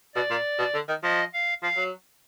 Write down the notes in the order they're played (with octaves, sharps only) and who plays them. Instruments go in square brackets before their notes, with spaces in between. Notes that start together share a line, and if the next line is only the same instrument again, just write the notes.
[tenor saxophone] B2 [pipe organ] D5
[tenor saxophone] A#2
B2
D3
D#3
[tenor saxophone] F3 [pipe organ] D#5
[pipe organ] F5
[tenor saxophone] F3 [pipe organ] F5
[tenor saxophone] F#3